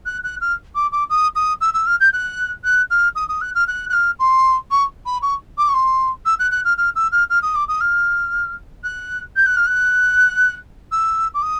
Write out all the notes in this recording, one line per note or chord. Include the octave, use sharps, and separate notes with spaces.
F#6
F#6
F6
D6
D6
D#6
D#6
E6
E6
F6
G6
F#6
F#6
F6
D#6
D#6
F#6
F6
F#6
F#6
F6
C6
C#6
B5
C#6
D6
C#6
C6
E6
F#6
F#6
F6
F6
E6
F6
F6
D#6
D6
D#6
F6
F#6
G6
F#6
F6
F#6
E6
D6
D#6